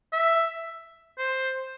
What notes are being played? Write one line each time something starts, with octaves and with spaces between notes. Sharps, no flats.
E5
C5